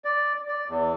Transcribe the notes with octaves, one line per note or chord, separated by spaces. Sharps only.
D5
D5
E2